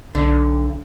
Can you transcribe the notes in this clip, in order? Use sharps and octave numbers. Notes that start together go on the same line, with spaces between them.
B1 D3